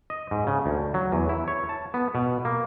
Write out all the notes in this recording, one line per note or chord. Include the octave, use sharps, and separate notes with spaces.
D#5
G#2
C#3
D2
F#3
E2
E4
C#5
A5
B3
B2
A#3